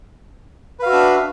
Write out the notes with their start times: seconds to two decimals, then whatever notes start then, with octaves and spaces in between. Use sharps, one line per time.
0.79 B4
0.83 F5
0.86 F#4
0.89 E5
0.92 D4